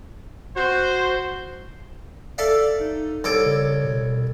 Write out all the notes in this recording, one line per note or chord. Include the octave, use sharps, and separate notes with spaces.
F#4 C5
A4 D5 E5 F5
D#4
C2 A4 C#5 D6
C#3
B2